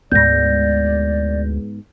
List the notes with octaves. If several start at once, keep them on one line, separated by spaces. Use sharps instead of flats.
D2 G#2 G#3 B3 D5 G6 A#6